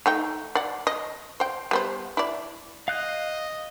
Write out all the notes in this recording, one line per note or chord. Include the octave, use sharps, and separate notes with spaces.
A3 D#4 G5
D5 F#5
D#5
C5 G5
G3 B3 C5
E4 D5
D#5 F5 F#6 G6